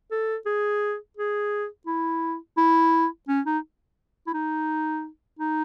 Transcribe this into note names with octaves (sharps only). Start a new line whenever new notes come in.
A4
G#4
G#4
E4
E4
C#4
D#4
E4
D#4
D#4